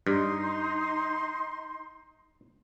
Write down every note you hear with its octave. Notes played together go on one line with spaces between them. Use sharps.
G2 D#4 C6